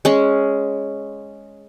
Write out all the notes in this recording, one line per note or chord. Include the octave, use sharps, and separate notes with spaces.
G#3 C#4